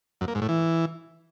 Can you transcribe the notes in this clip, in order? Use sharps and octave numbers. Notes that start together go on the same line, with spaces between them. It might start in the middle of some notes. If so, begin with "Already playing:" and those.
F#2
A#3
G#2
A2
E3